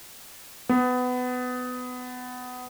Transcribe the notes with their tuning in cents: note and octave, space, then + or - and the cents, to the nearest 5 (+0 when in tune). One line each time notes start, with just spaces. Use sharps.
B3 +20